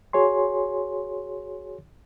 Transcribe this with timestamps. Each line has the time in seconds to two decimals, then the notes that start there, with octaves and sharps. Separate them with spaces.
0.13 F#4 G#4 C#5 G#5 C6